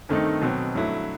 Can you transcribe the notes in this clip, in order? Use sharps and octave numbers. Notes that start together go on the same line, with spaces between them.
G2 D#3 A3 C4 D#4
B2 F#3 C4
G2 F#3 A3 E4